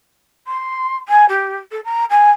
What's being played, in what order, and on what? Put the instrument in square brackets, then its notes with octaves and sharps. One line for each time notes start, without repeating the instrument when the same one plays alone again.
[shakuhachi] C6
G#5
G4
A4
A#5
G#5